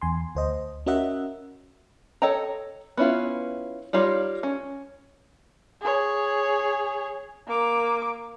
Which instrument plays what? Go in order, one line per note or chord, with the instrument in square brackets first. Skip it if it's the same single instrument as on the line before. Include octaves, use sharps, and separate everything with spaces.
[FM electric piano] E2 G#5 C6
D2 C5 D#5
C#4 F#4 A#4 D#5 E5 F#5
[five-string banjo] A4 C#5 D#5 G5 A#5
B3 C#4 E4 F4
G3 D#4 F4 C#5
C#4
[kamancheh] G#4 C#5
A#3 D6